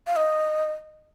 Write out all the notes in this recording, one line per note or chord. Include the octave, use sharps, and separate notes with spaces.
F5
D#5